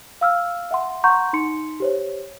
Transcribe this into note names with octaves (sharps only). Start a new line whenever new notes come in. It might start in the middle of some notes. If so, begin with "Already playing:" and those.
F5 E6 F6
E5 F#5 C6
F#5 A#5 C6 C#6 G6
D#4 C6 C#7
G4 C5 C#5